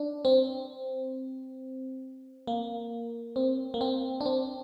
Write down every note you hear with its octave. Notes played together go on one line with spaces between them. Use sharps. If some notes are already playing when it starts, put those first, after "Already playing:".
Already playing: D4
C4
A#3
C4
A#3
C4
D4
C4